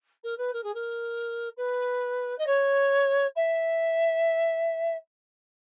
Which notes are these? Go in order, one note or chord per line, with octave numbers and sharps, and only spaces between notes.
A#4
B4
A#4
G#4
A#4
B4
D#5
C#5
E5